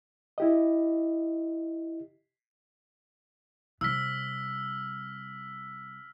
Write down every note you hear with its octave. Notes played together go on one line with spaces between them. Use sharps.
E4 G4 D#5
C3 G3 E6 F6 B6